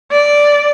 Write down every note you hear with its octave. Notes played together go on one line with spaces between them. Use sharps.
D5